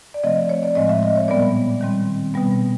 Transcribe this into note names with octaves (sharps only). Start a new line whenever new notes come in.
D5
C3 F3 A3 C4 D#5
D5
C#5
D5
A2 F3 G#3 C4 D#5
E5
D#5
C#5
A#2 G3 B3 D5
D#3 G3 C4
B2 G3 B3